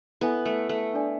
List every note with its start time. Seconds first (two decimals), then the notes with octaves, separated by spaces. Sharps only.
0.21 B3 E4 A4 E5 G#5
0.45 A3
0.69 A3
0.93 D4 A4 D5 G#5